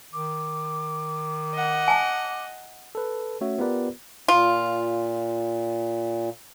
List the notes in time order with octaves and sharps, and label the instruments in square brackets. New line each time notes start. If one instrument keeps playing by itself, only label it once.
[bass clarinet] D#3 [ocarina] D6
[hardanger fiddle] D#5 F#5
[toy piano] G#5 A5
[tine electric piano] A4 B4
A3 C#4 F#4 C#5 E5
B3 F4 G4 A#4 B4 D5
[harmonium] A#2 [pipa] F4